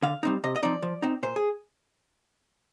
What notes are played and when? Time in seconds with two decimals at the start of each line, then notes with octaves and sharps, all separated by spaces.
0.03 D3 F5
0.23 G3 C4 D#4
0.44 C3 D#5
0.56 D#5
0.63 F3 C4 D#4 D5
0.82 F3
1.02 C4 D#4
1.23 A#2 C5
1.36 G#4